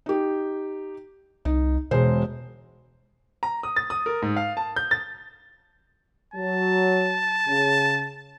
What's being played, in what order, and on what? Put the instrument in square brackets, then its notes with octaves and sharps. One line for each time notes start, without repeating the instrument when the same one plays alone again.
[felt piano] D#4 G4
[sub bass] C2 [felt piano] D#4
[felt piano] E1 G#3 C5 [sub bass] B2
[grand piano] A#5
D#6
A6
D#6
A#4
G#2
F5
A5
G6
A6
[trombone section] F#3 [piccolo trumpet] A5
[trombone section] C#3